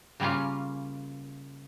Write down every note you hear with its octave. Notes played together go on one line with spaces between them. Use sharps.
C#3 G3 A#3 C#4 F4